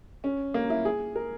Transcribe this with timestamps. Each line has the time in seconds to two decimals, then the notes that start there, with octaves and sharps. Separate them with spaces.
0.24 C#4
0.54 A#3
0.70 E4
0.85 G#4
1.16 A#4